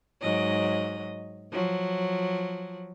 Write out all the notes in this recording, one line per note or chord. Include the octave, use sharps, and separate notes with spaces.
G#2 F#3 D#5
F3 F#3